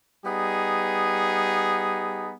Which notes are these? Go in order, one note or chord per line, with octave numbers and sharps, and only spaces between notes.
G3 B3 D#4 G#4